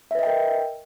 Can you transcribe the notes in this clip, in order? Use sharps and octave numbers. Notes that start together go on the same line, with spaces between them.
A#4 B4 D#5 E5 G5